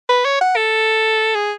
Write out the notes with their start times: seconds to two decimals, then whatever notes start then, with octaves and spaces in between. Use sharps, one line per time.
0.09 B4
0.25 C#5
0.41 F#5
0.56 A4
1.35 G#4